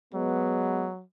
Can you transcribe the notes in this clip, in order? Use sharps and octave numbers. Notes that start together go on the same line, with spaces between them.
F#3 G#3 B3